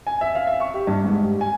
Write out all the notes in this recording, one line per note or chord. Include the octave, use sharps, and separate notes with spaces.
G#5
E5
F5
E5
C#6
G4
G2
G#2
G4
G#5